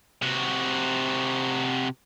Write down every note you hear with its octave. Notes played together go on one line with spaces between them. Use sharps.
C3 F#4